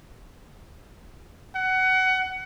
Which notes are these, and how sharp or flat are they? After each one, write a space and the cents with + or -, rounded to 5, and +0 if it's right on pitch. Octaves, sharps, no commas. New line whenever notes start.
F#5 +20